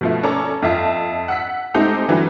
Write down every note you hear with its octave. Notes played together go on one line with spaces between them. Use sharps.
B2 F3 A3
C#4 A4 D5 A#5
F2 F4 E5 A5
F#5 E6 B6
G#3 A3 C4 D#4 G4 A4
D3 E3 F#3 G3